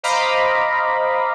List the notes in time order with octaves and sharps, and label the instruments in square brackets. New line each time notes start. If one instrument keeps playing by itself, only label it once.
[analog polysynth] C5 D#5 F5 A#5 B5 D6